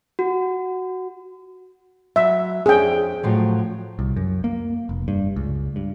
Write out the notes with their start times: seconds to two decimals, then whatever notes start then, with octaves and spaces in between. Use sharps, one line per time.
0.19 F#4
2.16 F#3 E5
2.66 F2 C#4 D4 G#4 G5
3.23 A2 F3 F#3
3.99 C2
4.16 F#2
4.44 A#3
4.89 F1
5.08 G2
5.36 C#2
5.76 G2